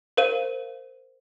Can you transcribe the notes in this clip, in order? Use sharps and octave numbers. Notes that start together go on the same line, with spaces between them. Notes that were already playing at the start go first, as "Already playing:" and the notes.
A#4 C5 F5 D#7